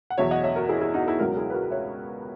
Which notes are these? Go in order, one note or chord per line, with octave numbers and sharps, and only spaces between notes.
F#5
E2 B2 F#3 C#5 E5
D#5 F#5
C#5 E5
F#4 A#4
E4 G#4
E4 G#4
D#4 F#4
E4 G#4
C#2 B2 F#3 F#4 A#4
E4 G#4
B4
F#4 A#4
C#5 E5